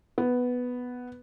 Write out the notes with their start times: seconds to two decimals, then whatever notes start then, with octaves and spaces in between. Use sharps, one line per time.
0.18 B3